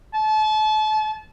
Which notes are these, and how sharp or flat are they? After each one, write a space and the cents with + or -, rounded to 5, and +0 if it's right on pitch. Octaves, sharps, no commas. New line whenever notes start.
A5 -35